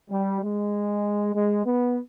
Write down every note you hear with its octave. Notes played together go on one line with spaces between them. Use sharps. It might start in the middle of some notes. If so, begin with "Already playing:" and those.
G3
G#3
G#3
B3